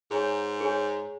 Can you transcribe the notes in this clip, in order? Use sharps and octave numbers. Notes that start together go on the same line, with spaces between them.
G#2 G#4 C#5 G#5
G#4 C#5 G#5